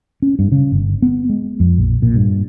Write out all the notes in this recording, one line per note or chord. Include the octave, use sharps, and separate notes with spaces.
C#4
G2
C#3
G1
B3
G#3
F2
A#1
A#2
G2